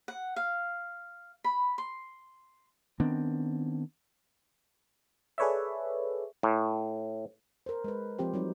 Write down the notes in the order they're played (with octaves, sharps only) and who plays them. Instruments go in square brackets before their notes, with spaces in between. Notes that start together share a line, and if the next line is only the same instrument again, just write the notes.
[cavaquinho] F#5
F5
B5
C6
[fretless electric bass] D#3 B3 C4 D4
[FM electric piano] G#4 A4 B4 C#5 D5 E5
[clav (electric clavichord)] A2
[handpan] A#4 C5
G#3 B4
F3 C4 G4 C5
F#3 G3 C4 D#4